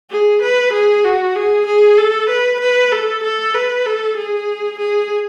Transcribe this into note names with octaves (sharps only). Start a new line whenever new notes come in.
G#4
B4
G#4
F#4
G#4
G#4
A4
B4
B4
A4
A4
B4
A4
G#4
G#4